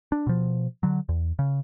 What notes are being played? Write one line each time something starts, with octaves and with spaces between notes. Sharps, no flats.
D4
B2 F3
D3 F#3
E2
C#3